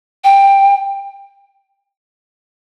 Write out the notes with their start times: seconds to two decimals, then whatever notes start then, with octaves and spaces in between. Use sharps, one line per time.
0.24 G5